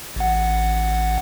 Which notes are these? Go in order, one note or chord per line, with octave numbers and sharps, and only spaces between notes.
A1 F#5